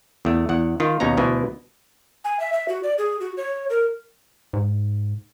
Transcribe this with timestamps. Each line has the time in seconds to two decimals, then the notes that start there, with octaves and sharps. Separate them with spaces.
0.25 E2 A3
0.49 E2 F#5
0.80 D#3 F4
1.00 D#2 B2 C#4 D#4 A#5
1.17 D2 B2 E3
2.24 G#5
2.40 E5
2.53 E5
2.68 F#4
2.83 D5
2.98 G#4
3.20 F#4
3.37 C#5
3.70 A#4
4.53 G#2